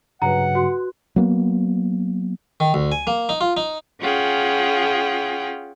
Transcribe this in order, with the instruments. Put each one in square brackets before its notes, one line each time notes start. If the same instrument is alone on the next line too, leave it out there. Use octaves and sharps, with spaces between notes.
[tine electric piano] G2 C#3 F#3 [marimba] F#4 B4 [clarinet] F#5 [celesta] A#5
[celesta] F#4 F#6 [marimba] C6
[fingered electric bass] F#3 A#3 B3
[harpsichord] D#3
D2
G#5
A#3
D#4
F4
D#4
[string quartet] C#4 F4 G#4 F#5 G5